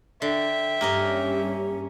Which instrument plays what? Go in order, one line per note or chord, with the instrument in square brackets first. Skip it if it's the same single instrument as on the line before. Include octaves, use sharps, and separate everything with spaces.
[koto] D3 [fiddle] E5 G5
[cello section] G2 C#4 [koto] A#3 A#4 D#5 [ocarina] G4